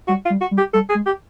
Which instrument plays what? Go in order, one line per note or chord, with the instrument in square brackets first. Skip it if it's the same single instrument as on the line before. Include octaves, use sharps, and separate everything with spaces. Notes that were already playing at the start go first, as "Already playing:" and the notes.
[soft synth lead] G3 [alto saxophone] F#4
[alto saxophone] F4
[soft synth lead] G3
[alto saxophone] F#4
[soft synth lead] G3
[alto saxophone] G4
[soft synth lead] G3 [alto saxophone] A4
[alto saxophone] G#4
[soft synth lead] G#3
[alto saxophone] G4